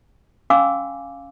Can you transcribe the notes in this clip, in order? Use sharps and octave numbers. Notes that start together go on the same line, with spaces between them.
C#4 F5 G#5 C6 D6 E6